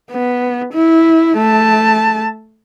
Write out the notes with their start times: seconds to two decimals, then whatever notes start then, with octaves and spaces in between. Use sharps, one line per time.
0.12 B3
0.73 E4
1.37 A3 A5